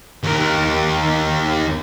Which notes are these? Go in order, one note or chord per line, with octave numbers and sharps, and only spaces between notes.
D#2 A#4